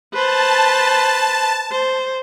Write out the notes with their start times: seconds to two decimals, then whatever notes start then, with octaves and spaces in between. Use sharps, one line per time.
0.14 B4 C5 A5
1.71 C5